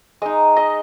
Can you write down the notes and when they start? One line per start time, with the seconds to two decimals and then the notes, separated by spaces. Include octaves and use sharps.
0.22 G#3 D#4 D#5
0.56 D#5